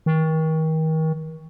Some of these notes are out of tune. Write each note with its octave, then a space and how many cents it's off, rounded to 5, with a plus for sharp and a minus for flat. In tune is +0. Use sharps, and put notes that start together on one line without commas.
D#3 +35